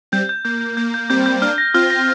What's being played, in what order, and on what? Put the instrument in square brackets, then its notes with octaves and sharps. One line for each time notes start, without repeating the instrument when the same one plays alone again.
[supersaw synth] G3 C4 [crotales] G6
[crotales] G6
[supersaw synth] A#3 [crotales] G6
[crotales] G6
[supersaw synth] A#3 [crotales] G6
[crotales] G6
[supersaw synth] G3 C4 [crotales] G6
[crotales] G6
[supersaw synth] A#3 D4 [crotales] F6
[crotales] A#6
[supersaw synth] C4 F4 [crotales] F6
[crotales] A#6